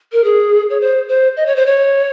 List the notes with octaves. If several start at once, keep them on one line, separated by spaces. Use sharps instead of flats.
A#4
G#4
C#5
C5
C5
D#5
C#5
C5
C#5